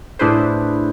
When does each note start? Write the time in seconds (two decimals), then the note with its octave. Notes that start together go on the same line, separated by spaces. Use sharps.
0.19 A2 D4 E4 G#4 B4 C5